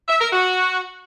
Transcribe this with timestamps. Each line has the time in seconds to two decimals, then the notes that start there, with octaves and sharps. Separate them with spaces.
0.09 E5
0.20 A#4
0.32 F#4